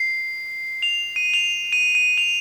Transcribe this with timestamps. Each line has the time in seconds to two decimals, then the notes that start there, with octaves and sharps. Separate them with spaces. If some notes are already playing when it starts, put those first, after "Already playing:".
Already playing: C7
0.82 F7
1.16 D#7
1.34 F7
1.72 D#7
1.95 D#7
2.18 F7